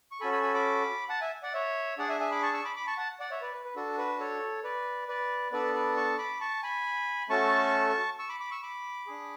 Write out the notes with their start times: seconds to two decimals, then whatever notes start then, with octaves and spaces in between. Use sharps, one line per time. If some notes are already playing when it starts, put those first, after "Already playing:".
0.11 C#6
0.21 C#4 F#4 A4 G#5 B5
0.32 G#5 B5
0.43 G#5 B5
0.54 B5 D6
1.09 F#5 A5
1.21 E5 G#5
1.43 D5 F#5
1.53 C#5 E5
1.98 D4 G#4 D5 F#5
2.09 E5 G#5
2.20 E5 G#5
2.31 B5 D6
2.42 A5 C#6
2.53 C#6 E6
2.64 B5 D6
2.76 B5 D6
2.87 A5 C#6
2.97 F#5 A5
3.20 D5 F#5
3.31 C#5 E5
3.42 B4 D5
3.54 B4
3.65 B4
3.76 D4 F#4 A4
3.98 B4
4.20 A4 C#5
4.64 B4 D5
5.08 B4 D5
5.52 B3 D4 A4 B4 D5
5.74 B4 D5
5.97 A5 C#6
6.18 B5 D6
6.41 A5 C#6
6.63 G#5 B5
7.29 A3 C#4 F#4 A4 A5 C#6
8.19 C#6 E6
8.29 B5 D6
8.40 B5 D6
8.51 C#6 E6
8.63 B5 D6
9.07 D4 G#4